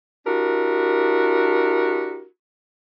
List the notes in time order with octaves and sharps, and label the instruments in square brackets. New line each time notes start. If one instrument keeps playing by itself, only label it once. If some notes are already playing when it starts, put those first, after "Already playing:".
[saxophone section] D4 E4 F#4 G4 A#4